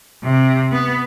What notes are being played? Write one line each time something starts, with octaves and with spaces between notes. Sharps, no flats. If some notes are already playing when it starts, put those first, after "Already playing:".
C3
B3